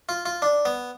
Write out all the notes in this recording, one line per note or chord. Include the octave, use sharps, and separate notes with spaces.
F4
F4
D4
B3